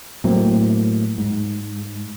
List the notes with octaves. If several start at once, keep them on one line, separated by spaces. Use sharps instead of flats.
A2 F#3 A#3 C4
G#2